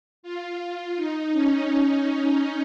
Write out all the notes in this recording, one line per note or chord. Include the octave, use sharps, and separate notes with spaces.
F4
D#4
C#4